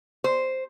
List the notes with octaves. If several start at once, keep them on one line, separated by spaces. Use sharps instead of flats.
C5